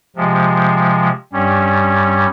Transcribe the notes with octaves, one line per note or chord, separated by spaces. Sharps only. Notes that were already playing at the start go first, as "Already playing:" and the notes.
C3 F3 G#3
G2 G3 C#4